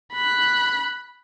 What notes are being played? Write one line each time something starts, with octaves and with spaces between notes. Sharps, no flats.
B5 F#6